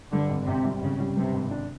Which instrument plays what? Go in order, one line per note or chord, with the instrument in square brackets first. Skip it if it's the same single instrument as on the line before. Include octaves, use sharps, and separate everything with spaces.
[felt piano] G2 [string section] D3
[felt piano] G#1
[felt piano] G#1 [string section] C3
[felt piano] G3
[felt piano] G#1 [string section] C#3
[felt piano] G3
[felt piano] G2 [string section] C3
[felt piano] G#1
D4